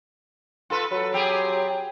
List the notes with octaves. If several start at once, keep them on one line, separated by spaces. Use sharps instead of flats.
F4 A4 B4
F#3 A4 B4
C4 G4 G#4